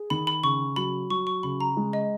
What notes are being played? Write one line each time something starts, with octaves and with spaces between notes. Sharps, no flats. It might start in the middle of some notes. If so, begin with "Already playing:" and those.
Already playing: G#4
D#3 B5
B5
C#3 C#6
F#3 B5
F#3 C#6
C#6
C#3 B5
A#5
G#3
D#5